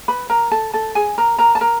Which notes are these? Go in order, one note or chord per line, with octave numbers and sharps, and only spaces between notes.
B4 B5
A#4 A#5
A4 A5
A4 A5
G#4 G#5
A#4 A#5
A#4 A#5
A5
A#4 A#5